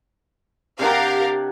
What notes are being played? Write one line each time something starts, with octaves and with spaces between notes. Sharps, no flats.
C3 D4 G4 A#4 F5 F#5